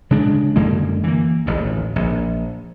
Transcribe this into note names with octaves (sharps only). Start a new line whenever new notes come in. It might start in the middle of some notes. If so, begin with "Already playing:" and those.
C#3 G#3 D4
F#2 D3 G#3 A#3
E3 A#3
D1 A1 D#2
A#1